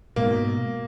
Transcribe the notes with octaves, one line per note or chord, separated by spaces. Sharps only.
G#2 B2 A#3